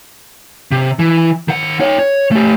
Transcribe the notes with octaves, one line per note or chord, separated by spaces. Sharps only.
C3
E3
D#3 F#5
D#4 C#5
C#5
A3 G4